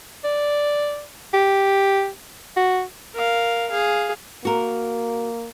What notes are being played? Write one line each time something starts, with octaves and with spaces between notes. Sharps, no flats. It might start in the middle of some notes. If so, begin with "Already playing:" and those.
D5
G4
F#4
A#4 F5
G#4 F5
A#3 F#4 A#4